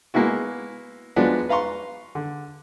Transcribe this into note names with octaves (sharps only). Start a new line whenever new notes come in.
G#3 A#3 B3 E4 F#4
F3 F#3 G#3 B3 D4
B4 F5 A#5 C6 C#6
D3